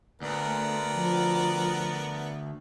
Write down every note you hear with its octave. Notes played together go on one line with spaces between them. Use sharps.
D2 B3 A#4 D5
A3
F3